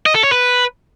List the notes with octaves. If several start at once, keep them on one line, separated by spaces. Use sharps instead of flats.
D#5
A4
C#5
B4